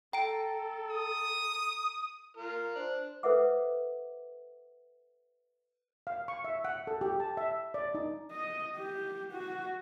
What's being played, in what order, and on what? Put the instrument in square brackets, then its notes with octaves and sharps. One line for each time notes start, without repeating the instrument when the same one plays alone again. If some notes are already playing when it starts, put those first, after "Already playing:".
[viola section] A4 [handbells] G5 [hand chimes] A#5 D7
[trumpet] D#6
[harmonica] F4 A#4
[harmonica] D4 D5 [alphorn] C5
[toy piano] A4 B4 C5 E5 F#5 D6
[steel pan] F5
C#6
E5
F#5
A4
G4
A5
E5
D5
D#4
[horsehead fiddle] D#5
G4
F#4